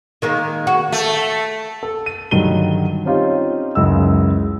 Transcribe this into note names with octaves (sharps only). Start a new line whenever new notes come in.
D#3 G#3 A#3
F#4
A3
A4
D#7
G2 D3 D#3 F#3 D#7 G7
C4 C#4 D#4 F4 G4
C#2 F#2 G#3 E4 E6